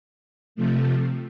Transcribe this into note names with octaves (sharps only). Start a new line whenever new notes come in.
C3 F3 A3